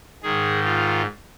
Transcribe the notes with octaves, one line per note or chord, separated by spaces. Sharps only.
G#2 D#3 G#4
F4